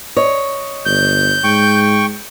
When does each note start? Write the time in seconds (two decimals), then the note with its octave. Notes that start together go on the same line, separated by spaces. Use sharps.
0.16 C#5 D#5
0.85 G1 G6
1.44 G#2 G5 C#6